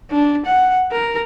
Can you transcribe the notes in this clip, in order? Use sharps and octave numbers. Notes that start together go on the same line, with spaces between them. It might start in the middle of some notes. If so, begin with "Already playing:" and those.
D4
F#5
A#4